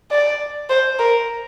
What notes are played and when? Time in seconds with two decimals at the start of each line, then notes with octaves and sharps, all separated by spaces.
0.11 D5
0.70 C5
0.99 A#4